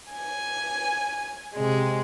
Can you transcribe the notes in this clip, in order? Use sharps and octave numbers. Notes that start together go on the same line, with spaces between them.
G#5
C3 G#3